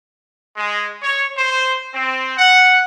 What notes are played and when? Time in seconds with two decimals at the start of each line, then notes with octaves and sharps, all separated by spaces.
0.57 G#3
1.03 C#5
1.38 C5
1.93 C4
2.38 F#5